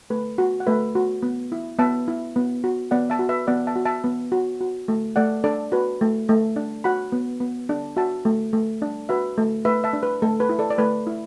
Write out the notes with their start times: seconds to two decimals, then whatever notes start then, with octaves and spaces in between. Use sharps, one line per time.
0.10 A3 B4
0.38 F#4
0.60 F#5
0.67 A3 B4 E5
0.95 F#4
1.23 B3
1.52 E4
1.79 B3 E5 A5
2.08 E4
2.36 B3
2.64 F#4
2.91 B3 D5 F#5
3.10 E5 A5
3.19 F#4
3.29 B4 E5
3.47 B3 D5 F#5
3.67 E5 A5
3.76 F#4
3.85 E5 A5
4.04 B3
4.32 F#4
4.61 F#4
4.88 A3
5.16 A3 D5 F#5
5.44 D4 A4 D5
5.72 F#4 B4
6.01 A3
6.29 A3
6.56 D4
6.84 F#4 F#5 B5
7.12 B3
7.40 B3
7.69 D4
7.97 F#4 E5 A5
8.25 A3
8.53 A3
8.82 D4
9.09 F#4 B4 E5
9.38 A3
9.65 A3 B4 E5
9.84 E5 A5
9.93 D4
10.03 B4
10.22 A3 A4
10.40 B4
10.49 E4
10.59 A4 D5
10.71 D5
10.78 A3 B4
11.07 E4